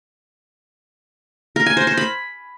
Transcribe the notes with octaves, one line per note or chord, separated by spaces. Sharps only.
A#4
G#5
C5
C5
B5